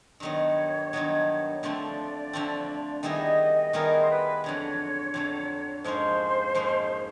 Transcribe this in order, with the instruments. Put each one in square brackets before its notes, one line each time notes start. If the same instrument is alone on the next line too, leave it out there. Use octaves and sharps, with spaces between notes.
[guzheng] G2 D#3 F#3 B3 [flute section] C#5
[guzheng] G2 D#3 F#3 B3
[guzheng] D3 F3 A3 C4 [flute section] D5
[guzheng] D3 F3 A3 C4
[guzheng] D#3 G3 B3 E4 G#4 [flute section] D#5
[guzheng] D#3 G3 B3 E4 G#4 [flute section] A#4
[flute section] C5
B4
[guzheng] F2 D3 F#3 [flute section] C#5
[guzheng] F2 D3 F#3
[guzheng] G#2 F3 A#3 C#4 [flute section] C5
[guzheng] G#2 F3 A#3 C#4